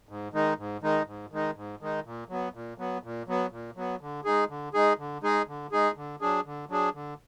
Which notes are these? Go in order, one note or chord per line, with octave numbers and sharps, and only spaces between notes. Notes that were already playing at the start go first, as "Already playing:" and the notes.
G#2
D#3 G#3 D#4
G#2
D#3 G#3 D#4
G#2
D#3 G#3 D#4
G#2
D#3 G#3 D#4
A#2
F#3 B3
A#2
F#3 B3
A#2
F#3 B3
A#2
F#3 B3
D3
G#3 D#4 G#4
D3
G#3 D#4 G#4
D3
G#3 D#4 G#4
D3
G#3 D#4 G#4
D3
F#3 D4 G#4
D3
F#3 D4 G#4
D3